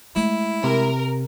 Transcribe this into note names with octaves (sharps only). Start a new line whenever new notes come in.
G#3 A3 E4
C3 A#4